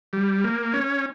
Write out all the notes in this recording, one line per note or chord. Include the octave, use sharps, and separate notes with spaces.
G3
A#3
C#4